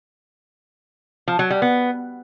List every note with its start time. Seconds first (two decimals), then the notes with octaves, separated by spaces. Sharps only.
1.28 F3
1.39 F#3
1.50 G3
1.62 B3